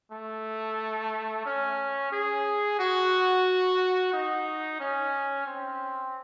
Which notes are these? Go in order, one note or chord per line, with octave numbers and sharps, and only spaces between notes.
A3
C#4
G#4
F#4
D#4
C#4
C4